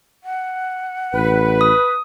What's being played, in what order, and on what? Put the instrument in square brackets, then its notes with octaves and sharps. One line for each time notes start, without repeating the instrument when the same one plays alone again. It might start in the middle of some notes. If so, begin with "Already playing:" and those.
[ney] F#5
[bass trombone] A1 [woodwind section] B4
[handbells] D#6